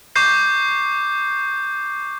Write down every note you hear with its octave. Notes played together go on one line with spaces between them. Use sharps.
C#6 D6 G6 C7